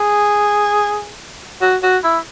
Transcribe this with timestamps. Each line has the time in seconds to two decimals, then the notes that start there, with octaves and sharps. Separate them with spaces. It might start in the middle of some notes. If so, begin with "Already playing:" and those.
Already playing: G#4
1.62 F#4
1.83 F#4
2.04 E4